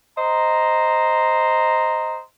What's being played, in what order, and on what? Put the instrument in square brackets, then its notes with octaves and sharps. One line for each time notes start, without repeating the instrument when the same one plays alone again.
[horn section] C5 D#5 A#5